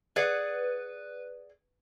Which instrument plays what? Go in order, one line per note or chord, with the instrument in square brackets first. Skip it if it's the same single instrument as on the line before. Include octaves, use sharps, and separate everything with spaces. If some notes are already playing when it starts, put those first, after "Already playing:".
[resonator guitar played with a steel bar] G#4 D5 F#5 [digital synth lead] B4